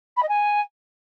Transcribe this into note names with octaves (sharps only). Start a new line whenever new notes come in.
B5
D#5
G#5